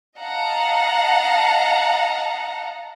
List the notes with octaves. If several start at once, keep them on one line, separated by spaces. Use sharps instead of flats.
D#5 F5 F#5 A5 A#5